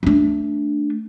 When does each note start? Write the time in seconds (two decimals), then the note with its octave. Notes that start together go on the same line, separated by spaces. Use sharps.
0.03 A3 D4